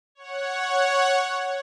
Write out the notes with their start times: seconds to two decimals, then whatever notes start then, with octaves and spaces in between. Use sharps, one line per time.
0.15 C#5 F#5